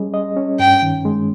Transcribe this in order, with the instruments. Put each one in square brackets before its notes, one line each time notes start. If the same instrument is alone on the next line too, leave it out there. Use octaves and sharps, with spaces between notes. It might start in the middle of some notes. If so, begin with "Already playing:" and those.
Already playing: [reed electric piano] G3 C#4 G#4 D#5
D#5
C#4
[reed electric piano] G2 [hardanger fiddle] G5
[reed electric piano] D#3
G#3